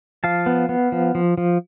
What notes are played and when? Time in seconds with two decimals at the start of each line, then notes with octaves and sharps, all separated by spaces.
0.24 F3 F5 A5
0.46 B3
0.69 B3
0.92 F3
1.15 F3
1.38 F3